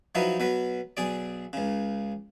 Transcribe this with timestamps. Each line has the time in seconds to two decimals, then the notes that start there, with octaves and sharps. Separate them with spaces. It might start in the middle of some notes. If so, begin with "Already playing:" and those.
0.15 F3 F#3 D#4 E4 B4
0.40 B2 F#3 B4
0.97 B1 G#4 D5
1.53 C#2 C#3